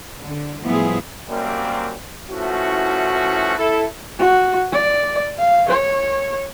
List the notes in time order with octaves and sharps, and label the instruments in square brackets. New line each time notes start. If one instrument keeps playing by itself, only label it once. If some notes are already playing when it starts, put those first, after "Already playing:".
[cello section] D3
A2 F3 G3 B3 E4 G#4
[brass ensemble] F#2 G3 A#3 C4
E3 F3 A3 C#4 E4 F#4
E4 A4
[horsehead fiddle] F#4
D5
F5
C#5